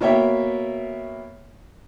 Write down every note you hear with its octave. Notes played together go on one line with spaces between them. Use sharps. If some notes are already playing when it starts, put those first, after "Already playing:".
B2 A#3 C#5 E5 G5